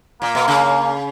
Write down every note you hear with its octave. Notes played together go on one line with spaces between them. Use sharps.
A#2 A#3
B2
C#3